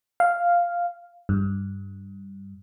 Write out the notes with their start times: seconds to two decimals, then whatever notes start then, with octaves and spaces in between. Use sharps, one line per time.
0.20 F5
1.29 G2